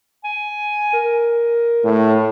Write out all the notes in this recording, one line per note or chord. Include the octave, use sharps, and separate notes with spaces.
G#5
A#4
A2